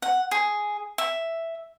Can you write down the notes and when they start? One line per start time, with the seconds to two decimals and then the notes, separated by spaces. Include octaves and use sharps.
0.02 F#5
0.31 G#4
0.98 E5